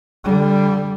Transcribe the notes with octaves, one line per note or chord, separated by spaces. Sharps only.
D3 G3